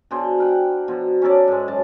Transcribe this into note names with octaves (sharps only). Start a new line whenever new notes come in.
B2 D4 G#4 C5
A#4 F#5 G5
B2 F3
C#4 D#4 A4 D5
G#2 G#3
F#2 A5